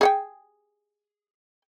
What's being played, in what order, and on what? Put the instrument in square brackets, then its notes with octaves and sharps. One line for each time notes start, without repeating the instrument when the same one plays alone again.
[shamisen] G#4 F#5 G5